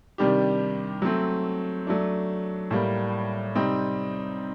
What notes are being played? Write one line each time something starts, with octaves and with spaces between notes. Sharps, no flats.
C3 D#3 G3 D4 G4
F#3 A3 C4
F#3 A3 D4
A2 G3 A#3
C3 G3 C4 D#4